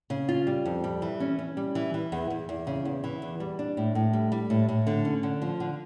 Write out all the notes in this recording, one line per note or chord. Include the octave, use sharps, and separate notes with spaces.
C#3
F4
G3
F2
G3
E3
C#4
C#4
G3
E3
E3
E2
E2
E2
C#3
E2
E3
E2
G3
D4
A2
A2
G3
G3
A2
A2
D3
C#4
D3
F3
D3